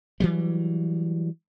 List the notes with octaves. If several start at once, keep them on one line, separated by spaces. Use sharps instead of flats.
E3 F#3 G3